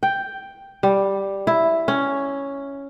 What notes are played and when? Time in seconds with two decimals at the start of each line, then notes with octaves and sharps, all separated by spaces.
0.03 G5
0.83 G3
1.47 E4
1.88 C#4